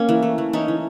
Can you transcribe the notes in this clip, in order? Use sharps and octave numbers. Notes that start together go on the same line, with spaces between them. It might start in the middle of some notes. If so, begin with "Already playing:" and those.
Already playing: A#3 C#4
E3
A3
E3
E3 C#4 D#4
E3